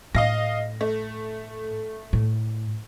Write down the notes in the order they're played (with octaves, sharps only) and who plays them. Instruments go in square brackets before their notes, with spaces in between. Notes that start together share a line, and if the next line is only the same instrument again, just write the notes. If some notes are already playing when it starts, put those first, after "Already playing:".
[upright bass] A2 [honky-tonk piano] D#5 F5 A#6
[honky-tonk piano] A3
[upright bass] A2